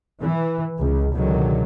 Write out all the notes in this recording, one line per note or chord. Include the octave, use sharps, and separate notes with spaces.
E3
C#2
C#2 B2 D3 D#3 F#3